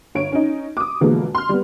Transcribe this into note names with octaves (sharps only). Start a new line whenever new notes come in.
G1 C#5 D7
C#4 D#4
D6 D#6
B2 D3 E3 F3 G#3 A#3
C6 F6
G3 B3